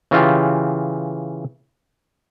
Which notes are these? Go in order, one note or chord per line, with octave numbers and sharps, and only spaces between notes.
C#3 E3 F4 G4